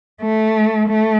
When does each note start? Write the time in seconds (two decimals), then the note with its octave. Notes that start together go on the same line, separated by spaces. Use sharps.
0.22 A3
0.88 A3